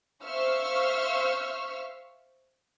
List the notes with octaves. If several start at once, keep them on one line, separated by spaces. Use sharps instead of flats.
C5 E5 F5 C#6 E6 F6